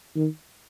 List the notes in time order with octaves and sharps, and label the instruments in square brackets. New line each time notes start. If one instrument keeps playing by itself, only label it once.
[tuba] D#3